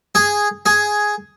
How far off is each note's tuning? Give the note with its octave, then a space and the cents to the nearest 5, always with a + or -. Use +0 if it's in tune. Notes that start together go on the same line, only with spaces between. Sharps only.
G#4 -5
G#4 +5